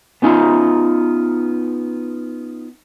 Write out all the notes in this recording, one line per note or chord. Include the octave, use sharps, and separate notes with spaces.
B3 C#4 D#4 F4